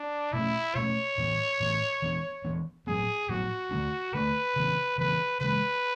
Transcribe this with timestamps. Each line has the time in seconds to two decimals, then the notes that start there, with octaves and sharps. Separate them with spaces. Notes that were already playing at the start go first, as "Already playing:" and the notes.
Already playing: D4
0.33 B2 A3 C#4 E4
0.75 B2 A3 C#4 C#5
1.18 A2 E3 B3
1.60 A2 E3 B3
2.02 E3 B3 D4
2.44 E3 B3 D4
2.87 A2 F#3 B3 G#4
3.29 A2 F#3 B3 F#4
3.71 D3 A3 D4
4.14 D3 A3 D4 B4
4.56 C#3 E3 B3 D4
4.98 C#3 E3 B3 D4 B4
5.40 C#3 E3 G#3 B4